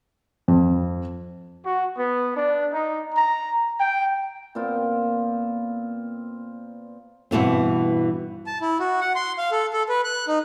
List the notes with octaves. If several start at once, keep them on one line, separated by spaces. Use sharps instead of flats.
F2
F#4
B3
D4
D#4
A#5
G5
A#2 B3 C4 F4
G2 B2 E3 C4
A5
E4
F#4
F#5
C6
F5
A4
A4
B4
F#6
D#4